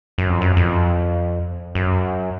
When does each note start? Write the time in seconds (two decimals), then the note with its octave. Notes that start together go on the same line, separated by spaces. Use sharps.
0.18 F#2
0.29 F2
0.41 F#2
0.57 F2
1.75 F#2